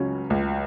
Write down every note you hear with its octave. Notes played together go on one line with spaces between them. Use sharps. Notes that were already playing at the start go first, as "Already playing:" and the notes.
Already playing: C#2 C#3 F#3 C#4
C#2